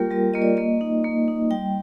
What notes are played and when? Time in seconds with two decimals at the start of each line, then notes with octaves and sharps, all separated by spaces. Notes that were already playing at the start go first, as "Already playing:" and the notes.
Already playing: G3 A#3 F4 G4 A#4 G5
0.10 G3 A#4
0.34 A#3 F4 D#5
0.42 D5
0.57 A#3 D#5
0.81 D#4
1.04 A#3
1.28 D#4
1.51 G3 G5